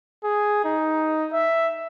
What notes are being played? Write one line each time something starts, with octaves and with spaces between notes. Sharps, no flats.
G#4
D#4
E5